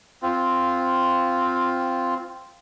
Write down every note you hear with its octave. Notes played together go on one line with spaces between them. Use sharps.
C4 F4